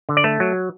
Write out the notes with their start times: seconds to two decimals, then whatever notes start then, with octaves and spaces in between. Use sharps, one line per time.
0.09 D3
0.17 D5
0.24 A3
0.40 F#3